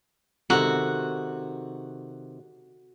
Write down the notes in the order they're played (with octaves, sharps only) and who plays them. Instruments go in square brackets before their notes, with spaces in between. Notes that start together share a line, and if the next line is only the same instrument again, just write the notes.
[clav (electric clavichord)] C3 D#3 [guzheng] F#4 [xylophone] A4 A#5